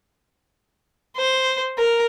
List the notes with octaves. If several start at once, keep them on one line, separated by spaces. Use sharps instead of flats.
C5
A#4